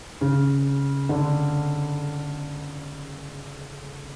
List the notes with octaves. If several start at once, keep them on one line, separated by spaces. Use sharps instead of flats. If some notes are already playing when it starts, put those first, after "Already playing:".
C#3
D3